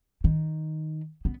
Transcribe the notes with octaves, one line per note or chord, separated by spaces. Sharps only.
D#3
B3